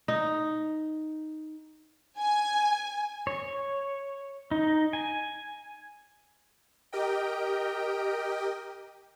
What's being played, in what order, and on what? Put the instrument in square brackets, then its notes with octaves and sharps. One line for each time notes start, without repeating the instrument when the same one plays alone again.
[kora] D#4
[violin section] G#5
[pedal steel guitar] C#5
D#4
G#5
[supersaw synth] G4 A#4 D#5 G5